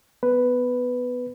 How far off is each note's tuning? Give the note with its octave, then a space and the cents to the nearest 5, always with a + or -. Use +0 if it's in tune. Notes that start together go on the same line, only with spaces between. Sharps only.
B3 +10 B4 +5